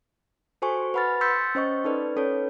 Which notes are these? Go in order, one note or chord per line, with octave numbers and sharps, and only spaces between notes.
F#4 A4 C5 G#5 C#6
B4 F#5 B5 F6 A6
C6 E6 G6 A6 B6 C#7
C#4 C5 D#5 C#6
D#4 A4 B4 D5
C#4 A4 B4 C#5